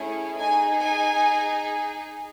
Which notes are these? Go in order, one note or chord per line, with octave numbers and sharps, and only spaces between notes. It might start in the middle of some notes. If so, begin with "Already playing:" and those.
Already playing: A3 C#4 E4 G#4
D#4 G#4 G#5
G#5